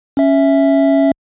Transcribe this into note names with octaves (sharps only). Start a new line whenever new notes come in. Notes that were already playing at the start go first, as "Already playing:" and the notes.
C#4 E5